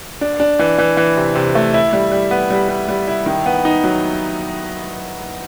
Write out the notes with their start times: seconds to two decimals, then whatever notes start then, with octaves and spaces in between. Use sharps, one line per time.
0.21 D4
0.40 D4
0.59 E3
0.78 E3
0.97 E3
1.17 C3
1.35 C3
1.55 A3
1.74 E4
1.93 G3
2.12 G3
2.31 B3
2.50 G3
2.69 G3
2.89 G3
3.08 E4
3.26 D#3
3.46 B3
3.65 D#4
3.84 F#3